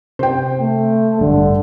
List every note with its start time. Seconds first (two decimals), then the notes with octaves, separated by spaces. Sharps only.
0.19 C3 C5 G5
0.60 A3
1.20 A1 G2 D3